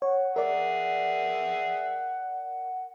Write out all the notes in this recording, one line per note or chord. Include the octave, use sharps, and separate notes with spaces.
C#5 F#5
G#4 A#4 D5 E5